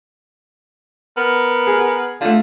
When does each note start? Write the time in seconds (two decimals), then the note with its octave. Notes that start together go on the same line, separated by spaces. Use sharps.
1.17 B3 A#4
1.67 G#4
2.21 D3 A3 F4